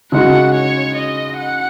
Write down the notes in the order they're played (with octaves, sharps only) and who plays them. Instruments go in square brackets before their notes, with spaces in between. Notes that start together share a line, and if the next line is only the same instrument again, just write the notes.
[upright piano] C#3 G#3 D#4 F#4 [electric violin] F#5
[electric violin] C#5
D#5
F#5